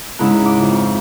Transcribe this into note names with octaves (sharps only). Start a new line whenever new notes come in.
G#2 C#3 E4 A#5 F#6
D6
F2